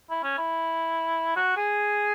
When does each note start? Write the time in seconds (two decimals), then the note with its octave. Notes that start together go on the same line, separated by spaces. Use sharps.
0.10 E4
0.24 C#4
0.38 E4
1.36 F#4
1.57 G#4